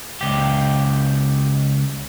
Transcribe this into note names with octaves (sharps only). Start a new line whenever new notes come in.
C#2 G4